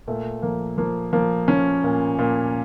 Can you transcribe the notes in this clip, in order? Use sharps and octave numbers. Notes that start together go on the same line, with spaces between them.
A#2 A3
F3 A#3
F3 A#3
F3 A#3
F3 C#4
A#2
A#2